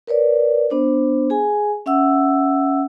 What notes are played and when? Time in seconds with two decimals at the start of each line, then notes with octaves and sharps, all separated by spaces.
0.07 A#4 B4 C#5 D5
0.70 B3 D4 C5
1.30 G#4 G#5
1.86 C#4 E5 F#5 E6